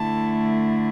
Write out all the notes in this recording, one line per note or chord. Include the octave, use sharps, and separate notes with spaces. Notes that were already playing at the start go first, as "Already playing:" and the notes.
Already playing: D3 A3 E4 A5